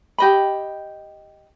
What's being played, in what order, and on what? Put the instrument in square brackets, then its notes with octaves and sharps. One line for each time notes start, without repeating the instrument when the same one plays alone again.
[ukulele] G4 D#5 B5